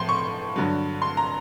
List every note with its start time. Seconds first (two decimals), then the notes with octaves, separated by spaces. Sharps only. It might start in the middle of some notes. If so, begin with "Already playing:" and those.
Already playing: A2 F3 C6
0.09 C#6
0.56 G2 D3 F#3
1.02 C6
1.17 A#5